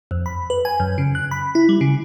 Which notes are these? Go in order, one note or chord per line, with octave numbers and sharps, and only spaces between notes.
F2
B5
B4
G#5
F#2
C#3
F#6
B5
E4
G3
C#3